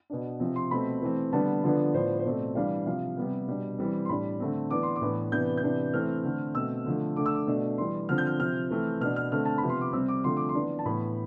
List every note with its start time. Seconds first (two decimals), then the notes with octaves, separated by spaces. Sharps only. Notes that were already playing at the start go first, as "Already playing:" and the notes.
0.10 B2 B3 D4
0.40 C3 F3 C4
0.56 C6
0.71 B2 A3 C4 B5
1.02 E3 A3 C4
1.33 D3 G3 B3 D4 A5
1.64 D3 F3 B3 D4
1.94 A2 F3 B3 D4 C5
2.19 C5
2.25 B2 A3 C4 D5
2.55 E3 G3 D4 F5
2.86 C3 F3 C4 F5
3.17 C3 G3 B3
3.48 B2 G3 D4
3.78 E3 G3 C4
4.05 C6
4.09 A2 G3 D4 B5
4.40 D3 A3 C4
4.70 E3 B3 D4 D6
4.83 C6
4.96 D6
5.01 A2 E3 B3 D4
5.32 C3 E3 B3 D4 G6
5.57 G6
5.63 C3 E3 B3 D4
5.94 E3 A3 C4 F6
6.25 D3 A3 C4
6.55 B2 A3 C4 E6
6.86 D3 F3 A3
7.16 D3 A3 D4 D6
7.26 E6
7.35 D6
7.47 B2 A3 D4
7.78 E3 G3 D4 C6
8.09 D3 F3 C4 F6
8.18 G6
8.27 F6
8.39 C3 F3 C4 F6
8.70 E3 A3 C4
9.01 B2 B3 D4 F6
9.16 F6
9.32 D3 A3 C4 F6
9.45 A5
9.58 C3 F3 B3 B5
9.69 C6
9.81 D6
9.93 C3 G3 C4 E6
10.08 D6
10.24 D3 F3 A3 C4 C6
10.37 D6
10.49 C6
10.55 E3 B3 D4
10.79 A5
10.85 A2 E3 B3 B5